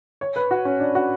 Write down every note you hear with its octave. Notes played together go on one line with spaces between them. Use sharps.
C#5
B4
F#4
C#4
D4
F#4